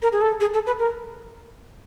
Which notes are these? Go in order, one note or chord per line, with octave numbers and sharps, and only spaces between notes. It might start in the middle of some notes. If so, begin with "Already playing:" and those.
A#4
G#4
A4
G#4
A4
B4
A#4